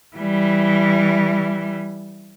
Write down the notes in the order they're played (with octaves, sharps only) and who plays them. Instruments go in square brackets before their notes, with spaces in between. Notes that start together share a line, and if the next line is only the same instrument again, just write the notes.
[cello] E3 G3